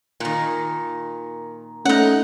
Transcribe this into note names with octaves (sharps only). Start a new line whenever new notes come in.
A#2 D#3
A3 C#4 D#4 F#5